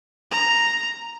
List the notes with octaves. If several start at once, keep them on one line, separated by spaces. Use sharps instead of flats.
A#5